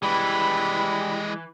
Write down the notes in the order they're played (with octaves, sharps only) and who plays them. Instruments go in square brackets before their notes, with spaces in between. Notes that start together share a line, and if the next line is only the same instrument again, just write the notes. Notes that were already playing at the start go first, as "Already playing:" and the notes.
[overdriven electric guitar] E3 [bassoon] G3 [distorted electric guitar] G#3 B4 [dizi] B5